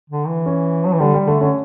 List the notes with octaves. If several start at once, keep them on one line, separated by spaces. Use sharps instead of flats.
D3
E3
C#4
F#3
E3
D3 G3
G3
D3 A3
D3 C#4